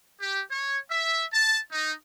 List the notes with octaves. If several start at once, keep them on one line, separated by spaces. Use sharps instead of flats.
G4
C#5
E5
A5
D#4